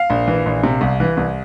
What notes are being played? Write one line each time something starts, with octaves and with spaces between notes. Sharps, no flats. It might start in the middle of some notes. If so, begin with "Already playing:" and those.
Already playing: F5
A#1
E3
A#1
C3
C2
E3
C2